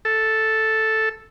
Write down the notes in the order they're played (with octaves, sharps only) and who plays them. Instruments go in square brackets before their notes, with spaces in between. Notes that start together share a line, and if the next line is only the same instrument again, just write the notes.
[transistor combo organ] A4